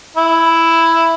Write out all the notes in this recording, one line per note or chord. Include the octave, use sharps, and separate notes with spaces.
E4